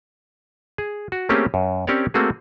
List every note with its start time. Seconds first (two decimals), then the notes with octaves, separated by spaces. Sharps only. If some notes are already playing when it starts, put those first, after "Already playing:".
0.78 G#4
1.12 F#4
1.29 A3 A#3 C4 C#4 G4 G#4
1.54 F#2
1.87 C4 C#4 G4 A#4 C#5 D5
2.14 A3 A#3 C4 F#4 G#4